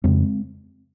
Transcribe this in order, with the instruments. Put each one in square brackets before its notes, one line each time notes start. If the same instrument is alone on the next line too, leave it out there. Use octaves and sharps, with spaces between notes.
[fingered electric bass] F2 C#3 G#3 C4